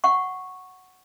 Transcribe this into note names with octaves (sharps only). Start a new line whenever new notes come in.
F#5 C#6